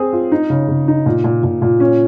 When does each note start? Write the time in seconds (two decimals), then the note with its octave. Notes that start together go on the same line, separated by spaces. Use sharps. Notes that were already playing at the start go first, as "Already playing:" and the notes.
Already playing: C4 G#4
0.13 F4
0.32 D#4
0.50 C#3
0.68 C#3
0.88 D#4
1.06 A#2
1.24 A#2
1.43 A#2
1.62 A#2
1.80 C#4